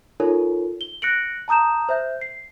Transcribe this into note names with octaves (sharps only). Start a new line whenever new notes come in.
D#4 F4 A4 A#4 C#5
G7
F#6 A#6 C#7 D7 F#7
A5 A#5 D#6 G6 E7
C5 E5 G6
C7